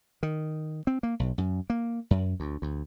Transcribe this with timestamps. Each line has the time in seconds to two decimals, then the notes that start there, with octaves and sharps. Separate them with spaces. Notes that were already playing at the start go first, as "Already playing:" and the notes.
0.23 D#3
0.87 C4
1.03 A#3
1.20 B1
1.38 F#2
1.70 A#3
2.11 F#2
2.40 D2
2.62 D2